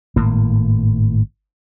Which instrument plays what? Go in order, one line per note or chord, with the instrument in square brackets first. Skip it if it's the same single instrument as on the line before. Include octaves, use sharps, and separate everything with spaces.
[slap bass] G#1 A2 A#3